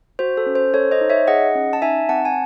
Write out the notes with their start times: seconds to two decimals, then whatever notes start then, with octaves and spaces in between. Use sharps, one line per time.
0.19 F#4 C5
0.37 A4
0.46 C#4
0.55 C5
0.74 A4 C#5
0.91 C5 D#5
1.01 D#4
1.10 C#5 E5
1.28 G#4 D#5 F#5
1.55 C#4
1.73 A5
1.82 D#4 E5 G#5
2.09 C4 F#5 A5
2.25 G#5